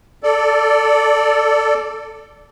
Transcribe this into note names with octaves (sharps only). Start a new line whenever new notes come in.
A4 D5